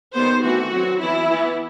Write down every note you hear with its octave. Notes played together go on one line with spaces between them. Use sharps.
D#3 G3 B3 C5
E3 A3 C4 F#4
F#3 C4
E3 B3 E4
E3 B3